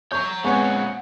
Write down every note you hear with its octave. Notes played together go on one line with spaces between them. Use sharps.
C#5 A#5 C#6 G6
A#2 G#3 B3 C4 C#5 F#5 G#5 C#6